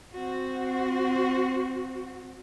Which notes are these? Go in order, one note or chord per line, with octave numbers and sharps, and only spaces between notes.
C4 F#4